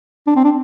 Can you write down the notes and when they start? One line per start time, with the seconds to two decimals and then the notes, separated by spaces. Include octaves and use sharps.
0.27 D4
0.36 C4
0.44 D4